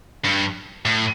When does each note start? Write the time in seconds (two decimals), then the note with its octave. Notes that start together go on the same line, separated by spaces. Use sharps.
0.25 G2
0.85 A2